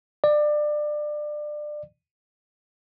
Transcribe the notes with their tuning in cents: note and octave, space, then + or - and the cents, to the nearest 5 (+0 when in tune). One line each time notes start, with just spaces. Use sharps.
D5 +25